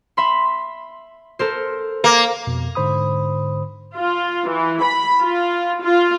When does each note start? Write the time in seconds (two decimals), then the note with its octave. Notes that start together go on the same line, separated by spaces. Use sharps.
0.17 E5 B5 C6
1.39 A4 A#4 C5
2.04 A#3
2.47 F2 B2
2.75 G#2 D3 C5 B5 D#6
3.97 F4
4.50 E3
4.84 B5
5.21 F4
5.82 F4